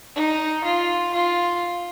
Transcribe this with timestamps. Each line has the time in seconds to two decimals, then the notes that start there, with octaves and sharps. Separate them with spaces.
0.15 D#4
0.64 F4
1.14 F4